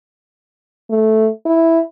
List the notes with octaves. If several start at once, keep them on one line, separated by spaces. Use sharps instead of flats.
A3
E4